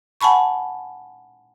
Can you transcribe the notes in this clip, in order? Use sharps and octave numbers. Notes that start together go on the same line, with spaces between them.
F#5 G#5 A5 B5 C#6